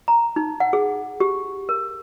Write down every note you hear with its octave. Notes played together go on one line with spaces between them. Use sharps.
A#5
D#4
F#5
G#4
G4
A#4